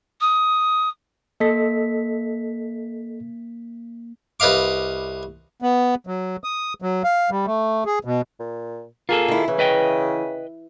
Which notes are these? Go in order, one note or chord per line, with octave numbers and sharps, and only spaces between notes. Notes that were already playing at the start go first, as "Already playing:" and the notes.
D#6
A#3 A4 D#5 B6
C2 B4 D#5 F5 D6
B3
F#3
D#6
F#3
F5
G3
A3
G#4
B2
A#2
A#3 F4 G#4 A4
D#3 E4
C#3 E3
B4 D#5 G5